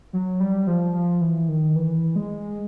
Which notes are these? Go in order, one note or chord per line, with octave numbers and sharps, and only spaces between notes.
F#3
G3
F3
F3
E3
D#3
E3
G#3